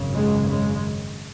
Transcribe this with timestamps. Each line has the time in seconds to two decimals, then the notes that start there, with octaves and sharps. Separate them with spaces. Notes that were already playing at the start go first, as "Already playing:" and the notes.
Already playing: G#1 F#2 C#3
0.14 G#3
0.47 G#3